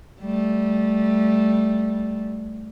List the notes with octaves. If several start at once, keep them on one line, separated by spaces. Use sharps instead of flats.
G3 A3